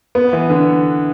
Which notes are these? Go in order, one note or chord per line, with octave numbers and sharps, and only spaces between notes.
B3
E3
D3